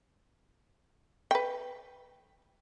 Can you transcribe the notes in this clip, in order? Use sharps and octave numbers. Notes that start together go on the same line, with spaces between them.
B4 G5